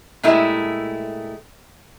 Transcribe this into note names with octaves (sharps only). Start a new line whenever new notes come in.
A#2 G#3 A3 E4 G4